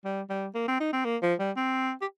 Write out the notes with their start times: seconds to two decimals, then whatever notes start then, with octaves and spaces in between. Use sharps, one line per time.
0.04 G3
0.29 G3
0.55 A#3
0.68 C4
0.80 D#4
0.93 C4
1.05 A#3
1.22 F3
1.39 G3
1.56 C4
2.01 G4